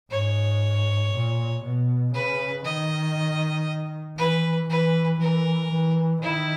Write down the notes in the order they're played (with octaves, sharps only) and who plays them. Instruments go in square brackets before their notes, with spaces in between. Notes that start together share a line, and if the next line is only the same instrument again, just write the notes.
[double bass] G#2 [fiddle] C#5
[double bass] A#2
B2
[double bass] C#3 [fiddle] B4
[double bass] D#3 [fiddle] D#5
[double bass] E3 [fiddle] B4
[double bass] E3 [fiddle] B4
[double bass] E3 [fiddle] A#4
[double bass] E3
[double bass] D#3 [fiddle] E4